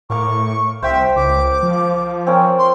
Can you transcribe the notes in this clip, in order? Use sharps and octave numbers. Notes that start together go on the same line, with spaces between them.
A2 A#4 F5 C#6 D6
C2 C5 E5 F5 G5
C#2 D6
F3
C4 C#4 A#4
C6